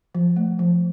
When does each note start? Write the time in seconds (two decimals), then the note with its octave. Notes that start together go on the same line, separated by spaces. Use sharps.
0.15 F3
0.36 A3
0.59 F3